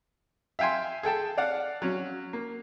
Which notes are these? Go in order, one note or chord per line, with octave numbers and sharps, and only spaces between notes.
E5 F5 G5 G#5 C6
G#4 A4 G5 A5
D5 F5 F#5
F#3 C#4
A#3